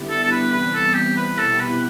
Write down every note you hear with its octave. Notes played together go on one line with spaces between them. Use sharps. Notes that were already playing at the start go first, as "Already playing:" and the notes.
Already playing: D3 G3 B3 E4 G4
A4
A4
B4
C3 E3 G3 B3 B4
A4
G4
B4
B2 B3 E4 G4 A4
B4